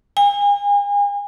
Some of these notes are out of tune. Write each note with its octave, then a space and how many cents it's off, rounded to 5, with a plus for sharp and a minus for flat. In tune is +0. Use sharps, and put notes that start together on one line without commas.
G#5 -40